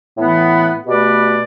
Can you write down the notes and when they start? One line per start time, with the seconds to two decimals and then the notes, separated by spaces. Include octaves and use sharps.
0.17 A2 E3 B3
0.86 B2 A3 G4 B4 D5